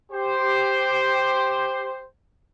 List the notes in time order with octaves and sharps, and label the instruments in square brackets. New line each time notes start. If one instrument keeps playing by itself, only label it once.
[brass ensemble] G4 C5